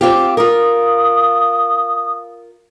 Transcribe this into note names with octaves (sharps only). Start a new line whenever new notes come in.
C4 F4 G4 D6
F4 A#4 D#6